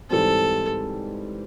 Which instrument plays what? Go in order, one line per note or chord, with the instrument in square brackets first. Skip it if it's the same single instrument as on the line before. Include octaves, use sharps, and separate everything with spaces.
[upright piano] G#2 E3 G3 C4 [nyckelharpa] A4